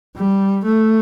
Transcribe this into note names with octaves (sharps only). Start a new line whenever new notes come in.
G3
A3